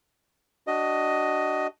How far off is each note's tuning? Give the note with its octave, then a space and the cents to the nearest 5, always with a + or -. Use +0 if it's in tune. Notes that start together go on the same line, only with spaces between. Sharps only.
D4 +0 F#4 +25 D#5 +5